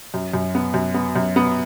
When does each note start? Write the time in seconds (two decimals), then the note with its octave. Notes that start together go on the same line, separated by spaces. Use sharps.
0.14 F#2
0.34 F#2
0.55 B3
0.74 F#2
0.94 B3
1.16 F#2
1.36 B3